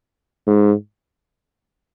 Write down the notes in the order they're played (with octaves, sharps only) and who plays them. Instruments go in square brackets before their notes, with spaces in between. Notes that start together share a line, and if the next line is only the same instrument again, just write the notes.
[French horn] G#2